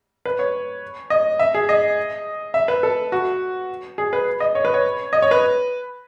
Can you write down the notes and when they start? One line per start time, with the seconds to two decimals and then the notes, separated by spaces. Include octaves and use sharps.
0.26 B4
0.39 C#5
1.10 D#5
1.39 E5
1.54 G#4
1.69 D#5
2.54 E5
2.68 B4
2.83 A4
3.12 F#4
3.98 G#4
4.13 B4
4.40 D#5
4.55 C#5
4.65 B4
4.74 C#5
5.13 D#5
5.22 C#5
5.31 B4